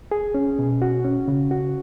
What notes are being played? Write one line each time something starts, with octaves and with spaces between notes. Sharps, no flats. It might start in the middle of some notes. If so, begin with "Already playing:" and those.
G#4
C#4
B2
F#4
C#4
C#3
F#4